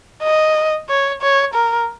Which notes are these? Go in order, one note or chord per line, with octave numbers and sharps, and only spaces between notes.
D#5
C#5
C#5
A#4